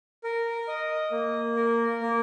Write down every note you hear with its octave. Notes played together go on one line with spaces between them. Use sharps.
A#4
D#5
A#3
A#4
A#3